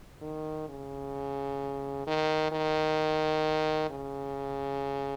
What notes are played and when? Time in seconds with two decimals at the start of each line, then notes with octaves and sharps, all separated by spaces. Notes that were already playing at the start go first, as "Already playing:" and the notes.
0.22 D#3
0.69 C#3
2.07 D#3
2.52 D#3
3.90 C#3